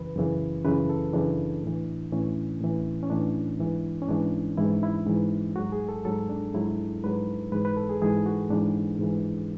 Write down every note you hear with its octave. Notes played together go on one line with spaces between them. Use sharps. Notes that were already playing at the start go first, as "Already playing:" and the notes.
Already playing: F#2 C#3 E3 B4
F#2 C#3 E3
F#2 C#3 E3 B4
A4
F#2 C#3 E3 D4
A2 E3
A2 E3 C#4
A2 E3
C#4
A2 E3 D4
G#2 E3
C#4
G#2 E3 D4
G#2 E3 E4
E4
G#2 E3
G#2 F#3 F#4
G#4
A4
G#2 F#3 A4
D4
G#2 F#3 E4
G#2 F#3 B4
G#2 E3 B4
B4
A4
G#4
G#2 E3 G#4
F#4
G#2 E3 D4
G#2 E3